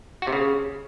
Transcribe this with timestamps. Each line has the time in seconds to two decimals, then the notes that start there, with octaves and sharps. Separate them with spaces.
0.22 F#4
0.27 C3
0.32 C#3